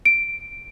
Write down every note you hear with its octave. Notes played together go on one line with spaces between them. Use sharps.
D7